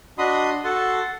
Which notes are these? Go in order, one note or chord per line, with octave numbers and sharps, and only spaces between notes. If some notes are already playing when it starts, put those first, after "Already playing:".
D4 F#4 D#5 B5 C6 D#6
F#4 A4 F#5 A5 C6